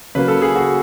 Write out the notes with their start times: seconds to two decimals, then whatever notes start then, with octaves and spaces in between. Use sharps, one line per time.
0.15 C#3 F#3 A#3 B4
0.28 A4
0.42 G#4
0.55 F#4